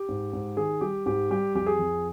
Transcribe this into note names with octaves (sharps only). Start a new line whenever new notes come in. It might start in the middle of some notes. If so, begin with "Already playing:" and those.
Already playing: G4
G#2
G#2
D#3 G#4
G3 G4
G#2 G4
G3 G4
F2 G4
G#4
F2